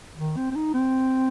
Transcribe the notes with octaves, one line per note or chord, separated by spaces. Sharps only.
D#3
C4
C4
D#4
C4